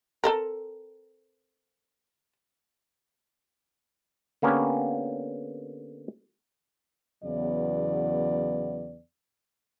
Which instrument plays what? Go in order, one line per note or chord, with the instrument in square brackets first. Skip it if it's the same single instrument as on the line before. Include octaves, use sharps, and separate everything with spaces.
[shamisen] C4 A4 A#4
[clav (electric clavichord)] D3 A#3 B3 C#4 G4
[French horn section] E2 C#3 E3 F#3 B3 D5